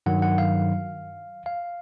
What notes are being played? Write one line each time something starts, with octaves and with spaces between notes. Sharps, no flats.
G2 D#3 F#3 F#5
F#5
F5
F5